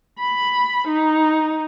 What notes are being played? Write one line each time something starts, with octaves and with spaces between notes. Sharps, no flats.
B5
D#4